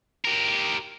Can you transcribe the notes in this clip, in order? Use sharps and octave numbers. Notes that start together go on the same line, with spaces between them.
G4 A#4